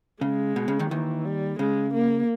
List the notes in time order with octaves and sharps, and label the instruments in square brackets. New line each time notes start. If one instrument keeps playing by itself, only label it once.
[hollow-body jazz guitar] C#3 [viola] G#3
[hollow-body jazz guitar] B2
C#3
D#2 D#3
[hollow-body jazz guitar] D#2 D#3 [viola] E3
[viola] G3
[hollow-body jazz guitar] C#3 [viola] G#3
[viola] A#3